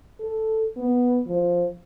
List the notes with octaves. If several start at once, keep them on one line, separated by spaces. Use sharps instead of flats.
A4
B3
F3